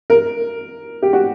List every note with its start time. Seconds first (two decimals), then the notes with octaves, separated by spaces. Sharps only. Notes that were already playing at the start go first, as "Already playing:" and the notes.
0.10 A#4
1.02 G4
1.13 F#4